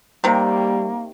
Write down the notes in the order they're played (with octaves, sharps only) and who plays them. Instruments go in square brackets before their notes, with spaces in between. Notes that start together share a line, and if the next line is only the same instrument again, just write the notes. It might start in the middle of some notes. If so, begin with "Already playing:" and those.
[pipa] C3 D#3 [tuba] G3 [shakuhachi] A#3